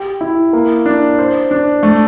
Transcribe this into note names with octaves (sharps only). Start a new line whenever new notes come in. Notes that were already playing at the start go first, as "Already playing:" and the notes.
Already playing: G4
E4
A#3
D4
C5
D4
A3